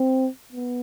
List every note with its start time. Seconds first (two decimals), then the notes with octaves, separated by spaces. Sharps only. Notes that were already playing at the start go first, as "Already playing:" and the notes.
Already playing: C4
0.52 B3